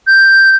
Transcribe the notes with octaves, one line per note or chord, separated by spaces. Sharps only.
G6